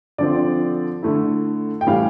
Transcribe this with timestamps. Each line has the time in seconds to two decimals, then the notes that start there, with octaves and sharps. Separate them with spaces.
0.18 D3 F3 C4 D5
1.02 D3 A3 E4
1.81 G5
1.87 A2 E3 G3 F5